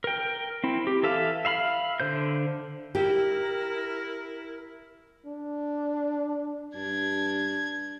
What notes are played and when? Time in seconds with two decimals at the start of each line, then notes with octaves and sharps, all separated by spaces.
0.04 A#4 G5
0.64 C4 E4
0.87 G4
1.03 E3 A4 E5 F5
1.45 E5 F5 B5 F6
2.00 D3 C5 G6
2.95 E4 G4 A#4
5.25 D4
6.74 G2 D4 G#6